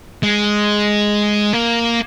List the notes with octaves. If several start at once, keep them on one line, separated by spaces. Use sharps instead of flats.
G#3
A#3